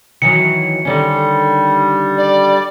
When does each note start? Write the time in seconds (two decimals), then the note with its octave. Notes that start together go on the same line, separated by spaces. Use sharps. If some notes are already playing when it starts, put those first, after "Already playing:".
0.22 D#3 E3 F#3 C#7
0.85 D3 D#3 G3 C#4
2.18 D5